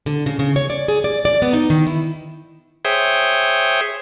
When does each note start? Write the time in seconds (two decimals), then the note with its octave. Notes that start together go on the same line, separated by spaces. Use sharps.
0.06 D3
0.26 C#3
0.39 C#3
0.56 C#5
0.70 D5
0.88 G#4
1.04 D5
1.25 D5
1.42 B3
1.53 D#4
1.70 D#3
1.87 E4
2.85 G#4 C5 C#5 E5 G5 D#6